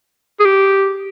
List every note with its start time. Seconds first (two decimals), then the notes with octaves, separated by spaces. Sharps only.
0.40 G#4
0.45 G4